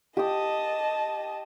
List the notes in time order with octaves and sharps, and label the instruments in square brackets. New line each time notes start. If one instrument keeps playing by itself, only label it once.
[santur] G4 D#6 [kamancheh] D#5 A5